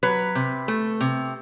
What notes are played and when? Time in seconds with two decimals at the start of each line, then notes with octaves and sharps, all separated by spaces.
0.03 F#3 B4
0.35 C3
0.68 A3
1.00 C3